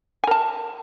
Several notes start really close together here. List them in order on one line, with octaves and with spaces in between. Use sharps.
G#5 A#4 A5